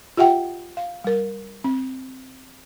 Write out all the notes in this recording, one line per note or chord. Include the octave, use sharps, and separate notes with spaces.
F4 G4 E5 F#5 G5
F5
G3 A#4
C4